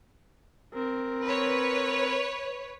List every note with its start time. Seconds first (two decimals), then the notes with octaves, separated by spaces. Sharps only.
0.74 C4 A#4
1.25 B4 C#5